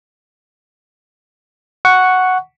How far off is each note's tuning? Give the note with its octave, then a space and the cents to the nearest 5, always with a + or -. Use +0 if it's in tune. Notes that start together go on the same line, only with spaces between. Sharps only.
F#5 +0 C#6 +5